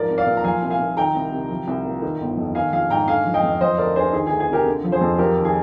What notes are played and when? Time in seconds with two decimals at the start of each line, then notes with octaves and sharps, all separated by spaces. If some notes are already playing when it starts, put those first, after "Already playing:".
Already playing: G#2 F3 A#4 D5
0.09 C2
0.18 D5 F5
0.26 A#2
0.37 A#5
0.44 F3 F5 G#5
0.62 C2
0.70 F5 G#5
0.79 A#2
0.97 D#3 G5 A#5
1.15 C2
1.32 C3
1.50 F3
1.67 C2
1.85 A#2
2.02 D#3
2.20 G1
2.38 F2
2.55 D#3 F5 G#5
2.73 A#1 F5 G#5
2.90 G#2 G5 A#5
3.08 D3 F5 G#5
3.26 F3
3.34 D#5 G5
3.43 F2
3.61 F3 C5 D#5
3.78 D2 A#4 D5
3.96 D3 G#4 C5
4.13 D#3 G#4
4.27 D2 G#4
4.40 G#4
4.48 C3 G4 A#4
4.66 D3
4.84 F3
4.92 G#4 C5
5.01 F2
5.18 F3 G4 A#4
5.37 D#2
5.45 G#4